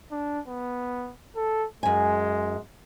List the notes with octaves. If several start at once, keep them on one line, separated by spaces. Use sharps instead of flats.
D4
B3
A4
F#2 G#3 G#5